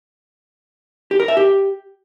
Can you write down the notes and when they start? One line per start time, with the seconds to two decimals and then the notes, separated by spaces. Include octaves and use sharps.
1.11 G4
1.20 A#4
1.28 E5
1.37 G4